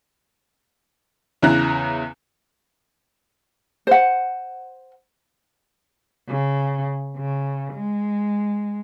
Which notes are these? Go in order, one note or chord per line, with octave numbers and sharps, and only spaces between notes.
E2 C#3 E4 A#5 F#6
C5 F#5
C#3
C#3
G#3